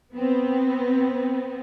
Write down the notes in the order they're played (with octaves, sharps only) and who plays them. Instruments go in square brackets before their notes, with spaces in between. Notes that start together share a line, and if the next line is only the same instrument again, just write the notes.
[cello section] B3 C4